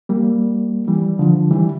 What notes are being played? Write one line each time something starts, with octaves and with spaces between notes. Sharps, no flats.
G3 A#3
E3 G3
D3 F3
E3 G3